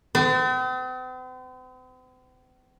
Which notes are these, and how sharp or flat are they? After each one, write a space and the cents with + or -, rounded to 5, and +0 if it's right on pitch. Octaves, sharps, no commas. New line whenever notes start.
C4 -45